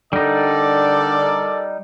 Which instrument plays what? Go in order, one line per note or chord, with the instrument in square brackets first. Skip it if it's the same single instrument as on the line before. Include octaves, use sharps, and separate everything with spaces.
[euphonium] D3 [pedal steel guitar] G3 D#4 [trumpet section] A4 A#4 D5